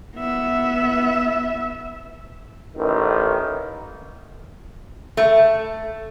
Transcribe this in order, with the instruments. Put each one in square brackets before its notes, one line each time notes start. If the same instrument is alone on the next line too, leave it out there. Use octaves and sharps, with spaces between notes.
[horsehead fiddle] B3 E5
[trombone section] A1 D#3
[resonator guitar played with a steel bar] A3